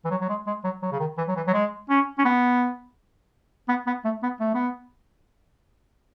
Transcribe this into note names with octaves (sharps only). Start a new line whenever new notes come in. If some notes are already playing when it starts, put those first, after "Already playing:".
E3
F#3
F#3
G#3
G#3
F#3
F#3
C#3
D#3
E3
F#3
E3
F#3
G#3
C#4
C#4
B3
B3
B3
A3
B3
A3
B3